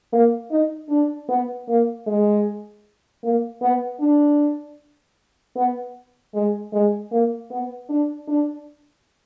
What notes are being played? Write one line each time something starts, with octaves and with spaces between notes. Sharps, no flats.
A#3
D#4
D4
B3
A#3
G#3
A#3
B3
D4
B3
G#3
G#3
A#3
B3
D4
D4